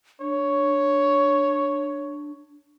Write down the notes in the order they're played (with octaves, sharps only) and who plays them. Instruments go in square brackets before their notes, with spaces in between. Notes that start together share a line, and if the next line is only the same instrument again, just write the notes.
[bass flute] D4 [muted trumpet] C#5